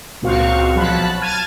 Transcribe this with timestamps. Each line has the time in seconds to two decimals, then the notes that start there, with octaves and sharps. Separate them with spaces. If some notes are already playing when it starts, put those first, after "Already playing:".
0.22 C#2 A#2 C4 F#4 F5 C#6
0.75 B1 F3 F#3 A5 B5 F#6
1.21 A5 F6 G#6 D#7